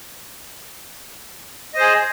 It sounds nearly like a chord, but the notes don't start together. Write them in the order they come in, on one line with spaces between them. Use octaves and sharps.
D#5 C5 G#4